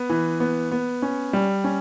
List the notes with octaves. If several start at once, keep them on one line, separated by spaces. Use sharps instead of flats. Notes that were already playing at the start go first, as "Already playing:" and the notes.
Already playing: B3
E3
B3
B3
C#4
G3
C#4